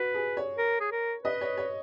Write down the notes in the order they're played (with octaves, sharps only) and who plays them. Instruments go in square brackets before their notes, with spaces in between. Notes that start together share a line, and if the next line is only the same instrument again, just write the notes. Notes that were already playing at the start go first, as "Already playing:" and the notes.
Already playing: [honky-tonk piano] F#4 [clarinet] B4
[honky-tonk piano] G#4
C#5
[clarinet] A#4
G#4
A#4
[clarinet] B4 [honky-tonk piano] D#5
[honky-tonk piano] C#5
C#5